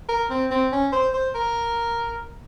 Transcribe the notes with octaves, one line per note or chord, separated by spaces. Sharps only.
A#4
C4
C4
C#4
C5
C5
A#4